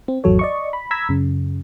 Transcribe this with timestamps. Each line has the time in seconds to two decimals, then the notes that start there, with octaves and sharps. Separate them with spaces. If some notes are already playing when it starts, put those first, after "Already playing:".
0.08 C4
0.24 G#1 E2 F#3 A4 C#5
0.39 D5 D#5 C#6
0.73 B5
0.91 A#5 B5 E6 G#6 B6
1.09 F#2 C#3